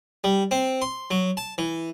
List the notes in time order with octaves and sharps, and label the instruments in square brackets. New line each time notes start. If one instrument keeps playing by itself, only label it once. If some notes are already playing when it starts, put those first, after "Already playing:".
[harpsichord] G3
C4
C6
F#3
A5
E3